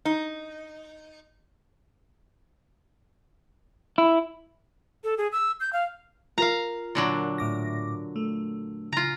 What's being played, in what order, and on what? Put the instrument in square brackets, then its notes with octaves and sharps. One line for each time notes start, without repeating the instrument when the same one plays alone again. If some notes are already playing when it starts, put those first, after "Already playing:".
[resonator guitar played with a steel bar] D#4
[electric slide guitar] E4
[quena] A4
G#4
E6
G6
F5
[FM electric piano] F4 A#4 [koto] F5 A#5
[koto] A#2 D3 F#3
[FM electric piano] A2 D6 A#6
A3
[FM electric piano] C#3 [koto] F4 A#5